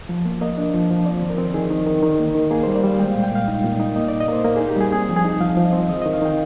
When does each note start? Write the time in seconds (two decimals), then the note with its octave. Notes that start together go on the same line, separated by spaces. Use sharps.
0.09 F3
0.25 A#3
0.41 A#3 D#5
0.57 D4
0.74 F3
0.90 F3
1.06 C4 D5
1.22 D#3
1.30 A#4
1.38 C4
1.54 D#3 G#4
1.70 D#3
1.87 D#3
2.03 D#3
2.19 A#3
2.35 D#3
2.51 A#3 G#4
2.63 G3 C5
2.75 D5
2.83 G3 F5
2.99 G#3 G5
3.11 A#2 F5
3.23 G5
3.32 A#2 F5
3.48 D#4
3.64 A#2
3.80 D#4
3.96 A#3 D#5
4.08 A#2 D5
4.20 D#5
4.28 A#3 C5
4.44 A#3
4.56 D#4 G#4
4.69 G4
4.76 G3 G#4
4.92 C4 G#4
5.09 F3
5.16 G#4
5.24 D#4
5.41 F3 F5
5.57 F3
5.65 D#5
5.73 C4
5.89 D#3 D#5
6.02 D#3 D#5
6.13 F5
6.22 D#3 G5